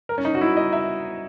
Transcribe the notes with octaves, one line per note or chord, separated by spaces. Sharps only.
A#4
C#4
D#4
F#4
E4
D#5
E5